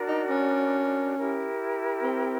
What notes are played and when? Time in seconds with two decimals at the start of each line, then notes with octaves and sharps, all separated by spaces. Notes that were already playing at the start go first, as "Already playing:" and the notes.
Already playing: D4 F#4 A#4 D5
0.08 D#4
0.30 C#4
1.17 E4 G4 A#4
2.03 C4